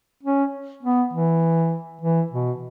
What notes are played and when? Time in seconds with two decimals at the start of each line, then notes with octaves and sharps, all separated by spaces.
0.23 C#4
0.83 B3
1.13 E3
2.01 E3
2.31 B2